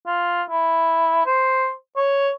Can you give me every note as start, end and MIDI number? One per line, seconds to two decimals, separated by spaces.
0.07 0.42 65
0.50 1.23 64
1.26 1.72 72
1.97 2.30 73